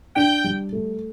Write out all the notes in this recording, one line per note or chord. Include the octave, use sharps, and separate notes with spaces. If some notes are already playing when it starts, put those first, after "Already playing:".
D4 G5
G3
A3